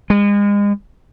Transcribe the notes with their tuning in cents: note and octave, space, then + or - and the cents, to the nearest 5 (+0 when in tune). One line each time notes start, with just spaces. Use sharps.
G#3 -35